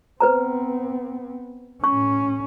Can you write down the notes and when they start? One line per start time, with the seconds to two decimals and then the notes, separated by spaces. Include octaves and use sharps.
0.20 B3 C4 B4 C5 A#5
1.84 A2 C#4 C#6